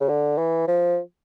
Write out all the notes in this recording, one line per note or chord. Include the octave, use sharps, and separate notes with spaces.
C#3
D3
E3
F3